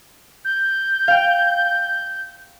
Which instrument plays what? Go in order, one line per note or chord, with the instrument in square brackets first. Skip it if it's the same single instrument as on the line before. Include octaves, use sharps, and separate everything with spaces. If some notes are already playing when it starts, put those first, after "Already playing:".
[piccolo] G6
[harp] F5 G5